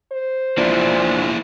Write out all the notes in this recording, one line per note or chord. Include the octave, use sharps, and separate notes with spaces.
C5
E1 F3 A#3 D4 E4